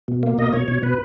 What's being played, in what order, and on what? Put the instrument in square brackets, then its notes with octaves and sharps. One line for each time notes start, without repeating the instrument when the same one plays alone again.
[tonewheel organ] B2
A#3
B2 D#5
B2 C#5
B2 C#5
B2 B4